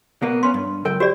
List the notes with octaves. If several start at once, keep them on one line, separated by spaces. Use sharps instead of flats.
B2 A#3 B3
B3 C#4 C6
G2
C#2 F#2 A#4 G5
F#4 G4 C5 D5